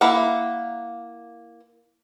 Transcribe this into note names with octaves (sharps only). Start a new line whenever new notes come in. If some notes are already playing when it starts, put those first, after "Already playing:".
A#3 E4 F5 F#5